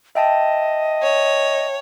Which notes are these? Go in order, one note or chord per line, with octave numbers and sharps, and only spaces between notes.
D#5 E5 G5 A5
C#5